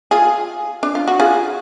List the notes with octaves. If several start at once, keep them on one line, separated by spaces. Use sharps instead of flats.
F4 G#4
D4
F4
F#4
F4 G#4